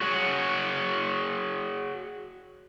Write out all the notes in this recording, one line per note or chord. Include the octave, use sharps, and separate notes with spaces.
F#4 G#4 C#5 F#5